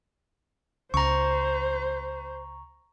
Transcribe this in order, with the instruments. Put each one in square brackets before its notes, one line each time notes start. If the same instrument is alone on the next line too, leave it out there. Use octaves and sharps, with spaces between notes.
[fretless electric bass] C#2 [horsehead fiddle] C5 [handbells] A#5 C#6